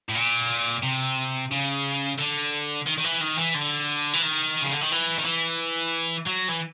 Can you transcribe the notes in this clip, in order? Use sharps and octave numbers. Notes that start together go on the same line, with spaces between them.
A2
A#2
C3
C#3
D3
D#3
D#3
E3
D#3
E3
D3
E3
D#3
C#3
D3
D#3
E3
D#3
E3
F#3
E3